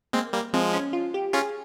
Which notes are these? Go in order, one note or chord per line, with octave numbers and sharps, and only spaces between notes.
G#3 A#3 C4
G3 A#3
F3 G#3 C4
C#4
F4
G4
C#4 F4 G#4